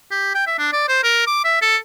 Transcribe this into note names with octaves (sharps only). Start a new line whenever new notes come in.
G4
G5
E5
D4
D5
C5
A#4
D6
E5
A4